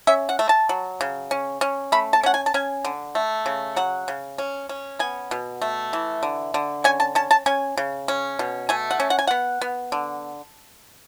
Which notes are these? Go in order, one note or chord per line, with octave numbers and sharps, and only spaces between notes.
C#4 E5
F#5
A3
A5
F#3
C#3
C#4
C#4
A3 B5
A5
C#4 F#5
G#5
A5
C#4 G#5
D3
A3
C#3
F#3 F#5
C#3
C#4
C#4
B3 G#5
B2
A3
E3
D3
D3
C#4 G#5
A5
C#4 A5
A5
C#4 G#5
C#3
C#4
B2
A3 G#5
F#5
C#4
F#5
G#5
B3 F#5
B3
D3